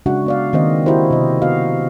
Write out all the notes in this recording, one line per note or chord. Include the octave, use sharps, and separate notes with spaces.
C#3 G#3 D4 F#4 E5 F#5
B3 D5 F5
D#3 A#3 C4 C5 D#5
E4 F#4 G4 A#4 C5
C3 D#5
B3 F#4 D#5 F5